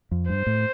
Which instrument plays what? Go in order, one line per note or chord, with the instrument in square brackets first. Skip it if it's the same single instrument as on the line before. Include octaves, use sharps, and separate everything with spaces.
[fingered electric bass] F2
[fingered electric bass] G2 [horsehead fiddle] C5
[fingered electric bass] A2